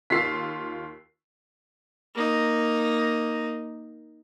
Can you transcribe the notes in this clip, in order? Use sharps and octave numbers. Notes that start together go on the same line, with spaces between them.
D#2 F4 E6 B6 C7
A#3 D#4